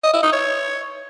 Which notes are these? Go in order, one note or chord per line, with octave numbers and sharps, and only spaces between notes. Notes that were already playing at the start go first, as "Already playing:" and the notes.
D#5
E4
D#4
C#5